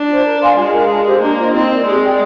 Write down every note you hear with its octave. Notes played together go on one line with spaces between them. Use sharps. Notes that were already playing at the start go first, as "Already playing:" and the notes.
Already playing: D4
F4 C5
A#4
F5 G#5 C6
G#3 F4
A#4 F5
D4
G4 C5
A#3 D4
F4 C5 D#5
C4 D#4
A#4 D5
G#3 G4
D5 G5